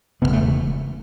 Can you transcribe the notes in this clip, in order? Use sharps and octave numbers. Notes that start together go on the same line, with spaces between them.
E1 E2 C#3 B3
A3